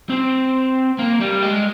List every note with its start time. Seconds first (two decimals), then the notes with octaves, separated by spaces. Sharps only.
0.10 C4
0.99 A#3
1.21 G3
1.43 G#3